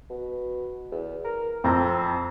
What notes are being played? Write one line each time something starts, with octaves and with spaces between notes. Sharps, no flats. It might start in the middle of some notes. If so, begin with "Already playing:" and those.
B2
E2
A#4
F2 C4 A#5